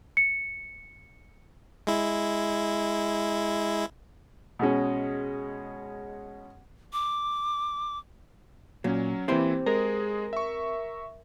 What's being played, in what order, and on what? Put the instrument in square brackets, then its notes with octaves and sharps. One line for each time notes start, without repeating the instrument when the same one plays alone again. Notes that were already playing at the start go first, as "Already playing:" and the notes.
[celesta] C#7
[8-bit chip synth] G#3 E4
[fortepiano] B2 G#3 C#4
[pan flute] D6
[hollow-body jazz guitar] A#2 [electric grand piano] F#3 C#4
[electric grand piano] E3 A#3 E4 [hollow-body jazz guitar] C4 G4 C5
[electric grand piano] G#3 G#4 [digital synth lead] A#4
[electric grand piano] E5 C#6